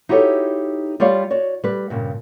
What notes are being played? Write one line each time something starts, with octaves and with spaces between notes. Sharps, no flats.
D#4 E4 F#4 G4 A4 C#5
G3 F4 G4 C#5 D5 F5
F#4 C#5 D5
G3 B4
G2 A#2 C#3